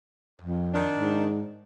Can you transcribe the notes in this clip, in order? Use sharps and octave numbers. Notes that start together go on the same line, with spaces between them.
F2
D#3 D4
G#2